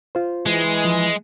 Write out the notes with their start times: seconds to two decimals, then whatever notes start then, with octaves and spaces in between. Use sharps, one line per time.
0.15 F4 C5
0.46 E3 G#3
0.85 F3